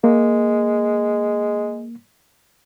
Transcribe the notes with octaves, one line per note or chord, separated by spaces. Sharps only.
G#3 A#3